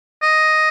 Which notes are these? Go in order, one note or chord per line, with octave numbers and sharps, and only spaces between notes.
D#5